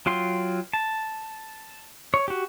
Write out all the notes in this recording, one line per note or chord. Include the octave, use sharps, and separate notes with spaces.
F#3 F4 G5 C6
A5
C#5
F#4 G4